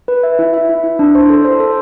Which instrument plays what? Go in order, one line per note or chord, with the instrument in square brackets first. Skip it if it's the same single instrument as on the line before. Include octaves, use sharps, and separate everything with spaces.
[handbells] B4
E5
E4
E5
E4
E4
D4
C5
A4
C5
A4